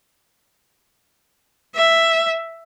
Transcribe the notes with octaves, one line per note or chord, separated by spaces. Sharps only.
E5